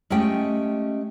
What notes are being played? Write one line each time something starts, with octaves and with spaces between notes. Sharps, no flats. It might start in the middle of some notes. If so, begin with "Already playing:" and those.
G#3 A3 C#4 G4 D#5 G5